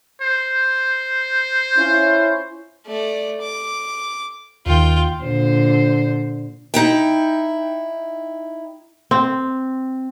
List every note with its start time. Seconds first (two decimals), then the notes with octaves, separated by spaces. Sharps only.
0.22 C5
1.78 C#4 E4 F4
2.87 A3 D5
3.41 D6
4.66 D#2 D#3 F4 G5
5.24 A#2 D3 C5
6.74 D#4 E4 G5
9.11 C4